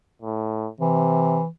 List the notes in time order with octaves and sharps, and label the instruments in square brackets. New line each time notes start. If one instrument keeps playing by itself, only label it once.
[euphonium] A2
[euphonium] C3 [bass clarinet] E3